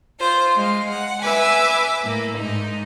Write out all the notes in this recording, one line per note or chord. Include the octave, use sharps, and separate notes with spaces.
F4 C5
G#3 F5
F#5
B4 E5 G#5 D6
A2 A#3
G#2 D#4